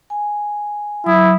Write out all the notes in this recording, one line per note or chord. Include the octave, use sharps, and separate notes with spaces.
G#5
F#3 E4 D#6